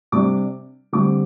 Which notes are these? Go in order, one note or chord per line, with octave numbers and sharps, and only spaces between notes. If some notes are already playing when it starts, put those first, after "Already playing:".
C3 G3 D4 D6
D3 G3 C4 D6